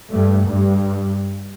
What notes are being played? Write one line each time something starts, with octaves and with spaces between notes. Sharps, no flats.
G2 A3
G2